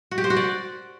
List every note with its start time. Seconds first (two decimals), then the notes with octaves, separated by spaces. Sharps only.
0.11 F#4
0.18 G4
0.24 C5
0.30 F#4
0.36 D5